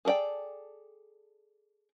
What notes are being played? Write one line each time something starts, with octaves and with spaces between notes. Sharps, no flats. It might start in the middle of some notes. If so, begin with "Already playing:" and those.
G#4 A4 B4 D5 G5